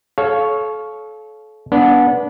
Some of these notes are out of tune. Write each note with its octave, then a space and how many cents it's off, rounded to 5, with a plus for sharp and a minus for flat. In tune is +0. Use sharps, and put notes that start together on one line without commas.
A4 -30 C#5 +0 F5 +0
B3 -20 D4 -20